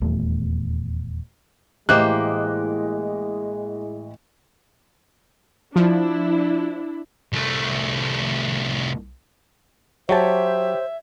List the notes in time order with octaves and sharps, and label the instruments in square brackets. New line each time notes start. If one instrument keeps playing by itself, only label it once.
[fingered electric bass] D#1 E2 A3
[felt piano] A1 E3 D#5 [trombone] G#3 [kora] A#3 G4 C5 [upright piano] F#6
[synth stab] F3 [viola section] D4 E4
[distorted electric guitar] C2 A3
[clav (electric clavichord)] F#3 A5 [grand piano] G4 C#5 [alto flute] C5 [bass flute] E5